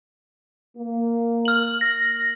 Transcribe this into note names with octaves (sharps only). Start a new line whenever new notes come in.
A#3
F6 F#7
A#6